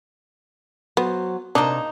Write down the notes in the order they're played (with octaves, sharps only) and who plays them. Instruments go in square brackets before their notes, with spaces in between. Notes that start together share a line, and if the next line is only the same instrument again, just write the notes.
[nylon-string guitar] F#3 F#4 C5 [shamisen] B3
[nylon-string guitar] C3 A5 [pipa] A#3 D#4 [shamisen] D4